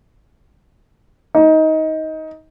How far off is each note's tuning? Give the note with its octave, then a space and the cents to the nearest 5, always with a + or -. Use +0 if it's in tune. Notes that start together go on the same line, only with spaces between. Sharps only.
D#4 +20